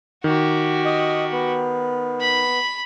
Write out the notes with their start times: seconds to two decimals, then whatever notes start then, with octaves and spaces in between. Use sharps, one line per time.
0.24 D#3 F#4 G4
0.85 D#5
1.32 B3
2.20 B5